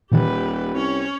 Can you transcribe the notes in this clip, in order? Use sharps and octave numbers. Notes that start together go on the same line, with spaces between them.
D#1 A#2 D#3 E3 G4 B4
C2 C#4 C#5